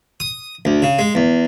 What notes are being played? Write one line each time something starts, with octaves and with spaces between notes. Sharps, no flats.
D#6
D2
C#3
G#3
E2